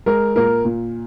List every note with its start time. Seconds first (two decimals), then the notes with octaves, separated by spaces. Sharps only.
0.06 G#3 A#4
0.36 A#2 A#4
0.65 A#2